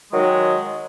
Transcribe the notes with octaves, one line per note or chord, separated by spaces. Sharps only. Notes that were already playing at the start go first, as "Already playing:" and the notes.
D#3 F#3 G#3